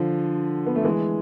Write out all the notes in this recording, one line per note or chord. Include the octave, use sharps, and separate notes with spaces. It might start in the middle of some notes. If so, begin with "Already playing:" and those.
Already playing: D3 F3
B3
A3
E3 G#3